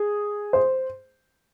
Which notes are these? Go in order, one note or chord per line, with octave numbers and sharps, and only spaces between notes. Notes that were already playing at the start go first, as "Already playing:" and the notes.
Already playing: G#4
C5